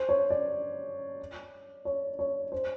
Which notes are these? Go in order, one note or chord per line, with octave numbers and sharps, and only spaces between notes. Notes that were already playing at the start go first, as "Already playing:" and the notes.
Already playing: C5
C#5
D5
C#5
C#5
C5